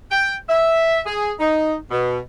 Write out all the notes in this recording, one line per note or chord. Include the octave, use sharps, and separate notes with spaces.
G5
E5
G#4
D#4
B2